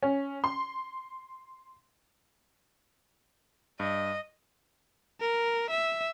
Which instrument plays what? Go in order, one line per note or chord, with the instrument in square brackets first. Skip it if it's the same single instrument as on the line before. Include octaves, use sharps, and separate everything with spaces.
[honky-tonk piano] C#4
C6
[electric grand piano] G2 [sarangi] D#5
[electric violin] A#4
E5